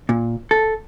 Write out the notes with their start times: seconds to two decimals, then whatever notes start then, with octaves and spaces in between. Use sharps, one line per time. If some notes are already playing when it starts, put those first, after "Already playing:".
0.09 A#2
0.51 A4